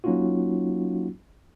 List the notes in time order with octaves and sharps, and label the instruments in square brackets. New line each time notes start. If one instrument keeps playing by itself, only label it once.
[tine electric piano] F#3 A#3 C#4 D#4 F4 F#4